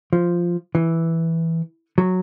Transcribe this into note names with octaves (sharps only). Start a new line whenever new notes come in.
F3
E3
F#3